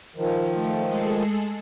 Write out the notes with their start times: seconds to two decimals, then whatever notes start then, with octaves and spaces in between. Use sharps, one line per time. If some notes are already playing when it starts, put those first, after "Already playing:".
0.16 D#3 F3
0.53 A3
0.85 G#3 G#4 A4